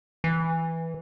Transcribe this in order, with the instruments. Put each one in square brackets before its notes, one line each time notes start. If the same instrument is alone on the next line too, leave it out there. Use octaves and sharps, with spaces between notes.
[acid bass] E3